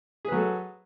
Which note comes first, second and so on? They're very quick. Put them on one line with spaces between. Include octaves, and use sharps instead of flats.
G#4 B4 F#3 A4